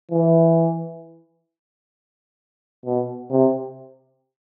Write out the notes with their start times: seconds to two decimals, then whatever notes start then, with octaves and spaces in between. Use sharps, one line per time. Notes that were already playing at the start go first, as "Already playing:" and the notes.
0.11 E3
2.86 B2
3.30 C3